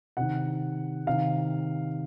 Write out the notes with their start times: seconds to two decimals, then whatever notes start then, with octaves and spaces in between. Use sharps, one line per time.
0.17 C3 D#3 F#5
1.07 C3 D#3 F5